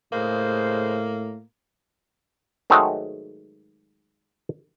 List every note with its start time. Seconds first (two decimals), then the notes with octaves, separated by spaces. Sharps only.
0.12 A2 C#3 G#3 A#3 C5
2.70 G#2 D#3 F#3 G#3 A3 F#4